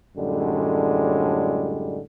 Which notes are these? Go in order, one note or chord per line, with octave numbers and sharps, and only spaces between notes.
F#2 A2 D3 G3 G#3